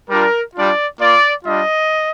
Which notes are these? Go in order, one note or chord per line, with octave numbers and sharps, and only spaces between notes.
G3 D4 F4 A#4
G3 D4 F4 D5
A#3 F4 D5
G3 D4 F4 D#5